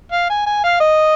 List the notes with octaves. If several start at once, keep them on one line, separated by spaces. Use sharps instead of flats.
F5
G#5
G#5
F5
D#5